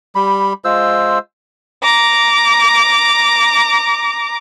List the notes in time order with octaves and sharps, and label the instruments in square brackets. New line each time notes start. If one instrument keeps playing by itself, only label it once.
[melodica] G3 B5
G#3 F4 C5 E6
[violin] A#5 D6